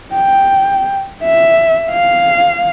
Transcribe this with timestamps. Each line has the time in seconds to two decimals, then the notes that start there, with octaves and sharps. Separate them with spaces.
0.15 G5
1.24 E5
1.91 F5